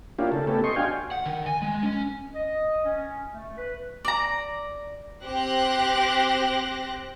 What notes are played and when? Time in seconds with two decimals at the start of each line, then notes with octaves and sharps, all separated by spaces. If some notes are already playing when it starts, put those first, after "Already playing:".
0.19 A#3 C#4 D4 E4 F4 G4
0.32 C#3 A4
0.47 A3 B3 C#4 G4 A4
0.64 D#5 C6 C#6
0.76 D4 F#4 F5 G5 G#5
1.11 F#5
1.26 D#3
1.46 G#5
1.62 G#3
1.83 C#4
2.34 D#5
2.85 C#4
3.34 A3
3.57 B4
4.05 D5 A#5
5.24 C4 G4 C5 F#6 A#6